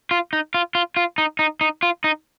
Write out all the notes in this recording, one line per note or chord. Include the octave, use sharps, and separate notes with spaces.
F4
D#4
F4
F4
F4
D#4
D#4
D#4
F4
D#4